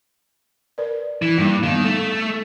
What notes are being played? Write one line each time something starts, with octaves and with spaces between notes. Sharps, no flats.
A#4 B4 D5
E3
G2 G3 A#3 D#4
D#3 B3 D4 F5
A3